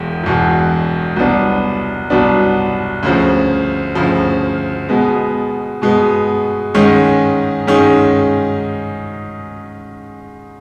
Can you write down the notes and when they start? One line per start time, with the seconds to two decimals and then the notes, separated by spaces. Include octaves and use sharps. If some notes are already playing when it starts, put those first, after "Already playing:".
Already playing: E1 E2
0.23 E1 E2 B2
1.16 C2 B2 F#3 B3 D4
2.10 C2 B2 F#3 B3 D4
3.03 D2 C#3 F3
3.95 D2 C#3 F3
4.89 B2 G#3 B3
5.82 B2 G#3 B3
6.74 G#2 D#3 G#3 C#4
7.67 G#2 D#3 G#3 C#4